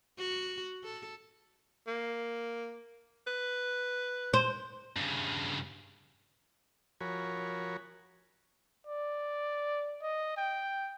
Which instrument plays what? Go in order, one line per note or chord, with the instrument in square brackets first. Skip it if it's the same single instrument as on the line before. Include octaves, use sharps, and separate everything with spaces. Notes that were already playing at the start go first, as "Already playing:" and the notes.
[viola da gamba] F#4
A4
[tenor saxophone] A#3
B4
[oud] C5
[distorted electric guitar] G2 C#3
[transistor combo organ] F3 F#4 A#4 C#5 G#5 B5
[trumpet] D5
D#5
G5